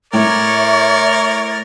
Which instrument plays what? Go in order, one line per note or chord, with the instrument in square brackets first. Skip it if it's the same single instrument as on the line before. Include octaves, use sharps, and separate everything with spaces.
[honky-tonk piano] A2 [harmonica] A#4 D5 [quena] C#5 [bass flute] E5